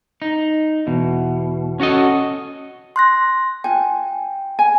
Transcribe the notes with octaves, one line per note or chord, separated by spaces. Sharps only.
D#4
E2 B2
C#4 F#4 A4 D#5
C6 F#6 A#6
F4 G5 G#5
G#5